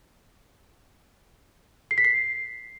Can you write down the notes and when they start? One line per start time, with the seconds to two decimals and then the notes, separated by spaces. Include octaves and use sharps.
1.91 C7
1.98 B6
2.05 C7